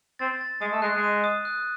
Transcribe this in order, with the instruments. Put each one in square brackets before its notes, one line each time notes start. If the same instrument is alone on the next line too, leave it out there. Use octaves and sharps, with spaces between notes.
[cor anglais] C4 [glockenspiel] A6
[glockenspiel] A6
[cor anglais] G#3 [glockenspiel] D#6
[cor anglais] A3
[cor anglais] G#3 [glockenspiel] F#6
[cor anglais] G#3
[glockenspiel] D#7
D#6
F#6